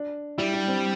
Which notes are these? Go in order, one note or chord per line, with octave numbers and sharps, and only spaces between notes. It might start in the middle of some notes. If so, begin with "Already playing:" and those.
Already playing: D4
G3 E4
D4
C4